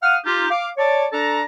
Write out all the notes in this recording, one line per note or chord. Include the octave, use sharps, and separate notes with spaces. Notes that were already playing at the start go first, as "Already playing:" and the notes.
F5 F#5 D#6 F6
D#4 F4 G4
F5 D6
C#5 D5 A5
D4 A4 D5 A5 A#5